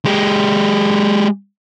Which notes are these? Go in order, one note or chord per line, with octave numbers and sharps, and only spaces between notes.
G#3 G4